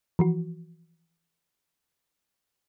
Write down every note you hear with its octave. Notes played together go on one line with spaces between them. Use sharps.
E3 F3 F#4